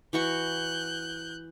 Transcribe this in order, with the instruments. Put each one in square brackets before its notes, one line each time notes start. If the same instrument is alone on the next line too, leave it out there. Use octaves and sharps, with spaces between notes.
[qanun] E3 F#4 C#6 [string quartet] F#6 G6